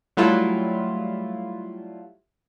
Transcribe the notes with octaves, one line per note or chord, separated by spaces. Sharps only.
F#3 G3 A3 E4 F4